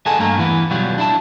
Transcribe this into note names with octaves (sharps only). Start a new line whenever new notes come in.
G#4 A4 D#5 F#5 G#5 A5
G2 A3 A#3 A#4
E3 B3
B2 F#3 G3 F4 F#4
D4 E4 A5